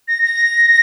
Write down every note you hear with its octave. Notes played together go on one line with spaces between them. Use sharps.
A#6
A#6